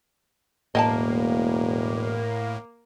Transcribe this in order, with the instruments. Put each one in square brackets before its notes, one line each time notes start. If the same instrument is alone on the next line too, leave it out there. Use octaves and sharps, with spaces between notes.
[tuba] E1 [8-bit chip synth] A2 [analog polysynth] A#3 [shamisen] D#5 G5 A5